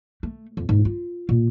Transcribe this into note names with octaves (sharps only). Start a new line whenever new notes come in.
A3
F2
G#2
F4
A#2